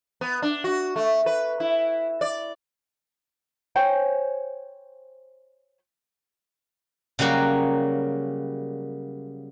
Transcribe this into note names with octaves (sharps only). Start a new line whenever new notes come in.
B3
D4
F#4
A3
B4
E4
D5
C5 C#5 G5 G#5
C#3 F#3 G3 A#3 F#4